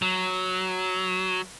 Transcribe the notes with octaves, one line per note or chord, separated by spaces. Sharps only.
F#3